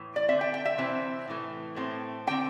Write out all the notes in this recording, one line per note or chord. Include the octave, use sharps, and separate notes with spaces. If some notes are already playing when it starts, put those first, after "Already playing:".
Already playing: A2 E3
D5
D3 C4 E5
G5
G5
E5
C3 E3 C4
A2 E3 A3
A2 A3 C4
D3 C4 G5